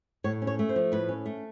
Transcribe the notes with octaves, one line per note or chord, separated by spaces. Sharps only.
A2 C#5
C#4
C#5
A3
C5
F3
A2 B4
C#4
A3